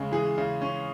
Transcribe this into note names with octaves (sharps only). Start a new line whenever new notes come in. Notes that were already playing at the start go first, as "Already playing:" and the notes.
Already playing: C#3 G#3
E3 G#4
C#3
C#4